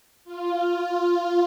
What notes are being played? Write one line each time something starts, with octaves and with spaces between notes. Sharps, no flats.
F4